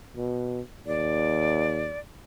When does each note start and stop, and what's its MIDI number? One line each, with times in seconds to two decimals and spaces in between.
0.17 0.61 47
0.86 1.93 39
0.86 1.99 74